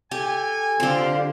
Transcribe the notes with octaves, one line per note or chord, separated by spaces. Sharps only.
G4 A4 G#5
D3 C4 F4 G4 F5